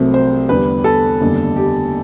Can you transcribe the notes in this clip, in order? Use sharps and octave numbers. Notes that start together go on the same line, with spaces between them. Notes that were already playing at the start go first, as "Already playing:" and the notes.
Already playing: C2 C3 F#3 A3 C4
C5
E2 D3 G3 B4
A4
F#1 E2 D3 G3
G4